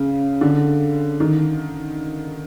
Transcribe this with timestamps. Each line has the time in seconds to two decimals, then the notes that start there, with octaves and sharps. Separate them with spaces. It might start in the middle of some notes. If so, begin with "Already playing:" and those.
Already playing: C#3
0.41 D3
1.20 D#3